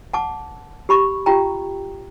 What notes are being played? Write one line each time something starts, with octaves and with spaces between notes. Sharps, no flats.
F#5 A5 D6
G4 B5 C#6
F4 G4 G5 A#5